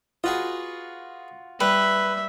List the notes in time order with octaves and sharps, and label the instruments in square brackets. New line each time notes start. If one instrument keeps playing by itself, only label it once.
[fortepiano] F4 F#4 [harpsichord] G#4 B4 D#5
[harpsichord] G3 [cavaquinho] B4 [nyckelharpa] E5